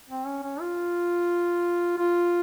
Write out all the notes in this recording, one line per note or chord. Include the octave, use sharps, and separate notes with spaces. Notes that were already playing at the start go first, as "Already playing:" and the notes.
C4
C#4
C#4
F4
F4